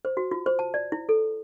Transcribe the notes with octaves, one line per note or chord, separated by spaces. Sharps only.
C5
F#4
F4
C5
A5
D5
E4
A4